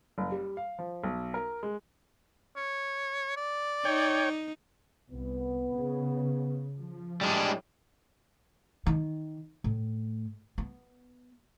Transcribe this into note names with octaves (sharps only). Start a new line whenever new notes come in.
F#1
G3
F5
F3
B1
A#4
G#3
C#5
D5
D#4 C#5 G5
C2 B3
C#3
F3
A2 G3 G#3 D4
D#3
A2
B3